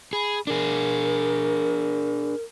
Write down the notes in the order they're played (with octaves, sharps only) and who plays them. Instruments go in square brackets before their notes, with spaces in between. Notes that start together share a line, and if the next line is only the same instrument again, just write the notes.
[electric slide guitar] G#4 [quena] B5
[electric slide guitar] D4 G#4 [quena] A#4